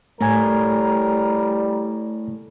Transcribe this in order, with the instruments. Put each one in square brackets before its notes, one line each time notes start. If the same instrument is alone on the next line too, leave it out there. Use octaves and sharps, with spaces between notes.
[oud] A2 [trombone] G3 [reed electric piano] A3 G#5 G#6 [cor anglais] A#4